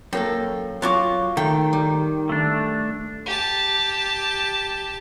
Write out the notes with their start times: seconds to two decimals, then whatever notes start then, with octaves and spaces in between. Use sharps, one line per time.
0.13 F#2 A#3 A4 G5
0.82 F#3 F4 C#6 D6
1.37 D#3 A3 G5
1.73 G3
2.29 A3 D4
3.26 G4 A5